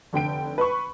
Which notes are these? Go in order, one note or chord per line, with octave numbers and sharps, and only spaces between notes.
F1 D3 G5 D7
B4 B5 C#6